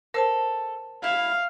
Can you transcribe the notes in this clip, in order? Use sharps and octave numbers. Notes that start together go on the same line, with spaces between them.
A4 A#4 C5 A5
E4 F5